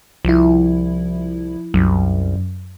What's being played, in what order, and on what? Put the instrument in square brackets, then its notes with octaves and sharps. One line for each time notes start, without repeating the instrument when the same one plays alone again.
[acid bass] C2 [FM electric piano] F3 E4
[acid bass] C2 [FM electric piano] F#2